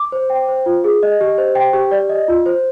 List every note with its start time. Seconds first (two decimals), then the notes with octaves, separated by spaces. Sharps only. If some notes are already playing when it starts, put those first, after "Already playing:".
Already playing: D6
0.12 C5
0.30 G5
0.49 C5
0.66 F4
0.84 G#4
1.03 D#5
1.21 G4
1.38 C5
1.55 G5
1.73 G4
1.91 D5
2.09 D#5
2.28 F4
2.46 C5